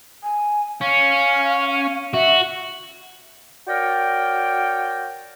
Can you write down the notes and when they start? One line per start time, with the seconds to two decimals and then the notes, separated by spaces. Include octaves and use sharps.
0.23 G#5
0.81 C#4 F5
2.14 F#4 E5
3.67 F#4 A#4 C#5 D5 G5